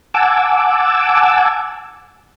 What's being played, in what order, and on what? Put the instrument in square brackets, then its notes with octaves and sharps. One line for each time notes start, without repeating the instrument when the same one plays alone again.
[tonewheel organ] F#5 G#5 A5 D6 E6